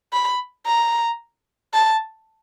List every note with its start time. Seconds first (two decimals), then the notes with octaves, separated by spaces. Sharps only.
0.13 B5
0.66 A#5
1.73 A5